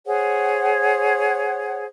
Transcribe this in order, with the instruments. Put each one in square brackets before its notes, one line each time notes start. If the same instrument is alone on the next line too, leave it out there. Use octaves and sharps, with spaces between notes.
[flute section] G#4 C5 C#5 F#5